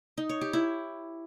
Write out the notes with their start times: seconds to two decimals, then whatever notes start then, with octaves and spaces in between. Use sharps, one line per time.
0.18 D#4
0.29 C#5
0.41 G4
0.53 E4